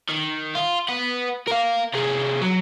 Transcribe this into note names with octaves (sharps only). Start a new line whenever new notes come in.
D#3
F4
B4 F#5
A#4 F5
C3 G#4
F#3